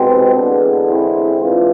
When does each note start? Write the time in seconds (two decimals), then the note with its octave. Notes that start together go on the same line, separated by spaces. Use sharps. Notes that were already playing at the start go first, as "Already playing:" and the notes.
Already playing: C2 B2 G#3 C4
0.34 E2 D3 G#3 B3 D4
0.88 C4 E4
1.41 G#2 E3 G#3 D4 F4